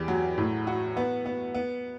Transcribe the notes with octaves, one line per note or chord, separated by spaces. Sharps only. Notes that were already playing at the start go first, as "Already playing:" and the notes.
Already playing: E2 G4
F#3
A2
F#4
B3
B3
B3